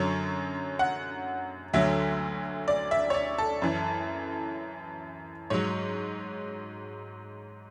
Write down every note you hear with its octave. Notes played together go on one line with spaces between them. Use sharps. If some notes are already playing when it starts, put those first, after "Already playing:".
Already playing: F#2 D3 F#3 C#5
F#5
D2 D3 F#3 E5
D5
E5
C#5
D5
A4
F#2 E3
G#2 F#3 C#5